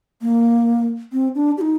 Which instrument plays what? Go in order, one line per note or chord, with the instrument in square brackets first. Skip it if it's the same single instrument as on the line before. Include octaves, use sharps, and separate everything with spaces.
[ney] A#3
C4
D4
G4
D#4